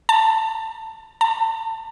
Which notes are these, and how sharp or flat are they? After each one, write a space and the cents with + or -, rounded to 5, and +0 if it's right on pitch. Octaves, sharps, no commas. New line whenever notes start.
A5 +15
A5 +30